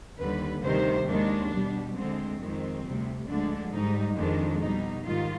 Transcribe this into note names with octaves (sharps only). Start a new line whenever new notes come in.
D#2 D3 G3 B4
D2 C3 D#3 G3 C5
D#2 D#3 G#3 D4
B2 G3
D2 D3 G#3 C4
F2 D#3 G#3 C4
D2 C3 G3
D2 D3 F3 G#3 D4
G#2 G3 D#4
F2 D#3 G#3 D4
B2 G3 D#4
G#2 D#3 G3 F4